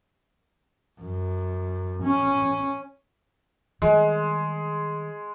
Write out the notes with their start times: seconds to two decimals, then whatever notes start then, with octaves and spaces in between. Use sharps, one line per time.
1.00 F#2
2.03 C#4
3.82 D#3 G3 G#3